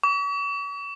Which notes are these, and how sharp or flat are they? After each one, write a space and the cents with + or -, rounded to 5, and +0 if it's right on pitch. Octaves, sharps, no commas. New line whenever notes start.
C#6 +45